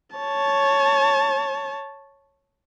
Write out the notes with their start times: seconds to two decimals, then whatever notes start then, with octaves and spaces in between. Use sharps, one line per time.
0.16 C#5 A5